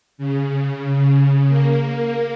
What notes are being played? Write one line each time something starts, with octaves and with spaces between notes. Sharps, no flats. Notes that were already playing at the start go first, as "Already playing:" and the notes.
C#3
A#3